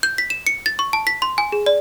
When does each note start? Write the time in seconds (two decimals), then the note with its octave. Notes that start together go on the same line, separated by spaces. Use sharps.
0.03 G6
0.18 B6
0.30 E7
0.47 C#7
0.66 A6
0.79 C#6
0.93 A5
1.07 B6
1.22 C6
1.38 G#5
1.52 G#4
1.66 D5